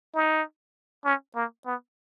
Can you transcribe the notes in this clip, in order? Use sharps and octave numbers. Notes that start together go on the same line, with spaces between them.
D#4
C#4
A#3
B3